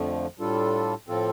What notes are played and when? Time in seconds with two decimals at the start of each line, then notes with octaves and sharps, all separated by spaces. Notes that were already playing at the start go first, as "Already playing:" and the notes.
Already playing: F2 D3 F3 A3
0.39 A2 G3 D4 F4 A4
1.08 A2 F3 C4 F4 A4